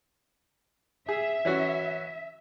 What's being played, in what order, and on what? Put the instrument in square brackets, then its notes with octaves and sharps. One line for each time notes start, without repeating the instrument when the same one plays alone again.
[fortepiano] G#4 [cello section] E5
[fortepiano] E3 C#4 F#4